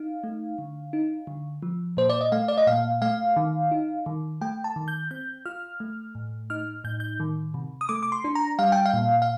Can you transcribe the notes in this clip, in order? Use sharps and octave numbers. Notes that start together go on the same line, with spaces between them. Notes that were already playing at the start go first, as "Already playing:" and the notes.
Already playing: D#4 F5
A3
D3
D#4
D3
F3
A#2 C5
D5
D#5
A3 F5
D5
D#5
A#2 F5
A3 F5
D#3
D#4
D#3
A3 G5
A5
D#3
G6
C4 G6
F4 F6
A3
A2
D#4 F6
A2 G6
G6
D#3
C3
D#6
A3 D6
D6
C6
D4
A#5
G3 F5
G5
F5
A#2
F5